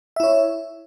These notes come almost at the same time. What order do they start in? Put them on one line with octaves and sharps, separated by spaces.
E5 E4 C#5